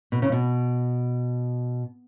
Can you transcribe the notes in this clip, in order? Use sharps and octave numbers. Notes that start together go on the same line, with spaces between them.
B2
C#3
B2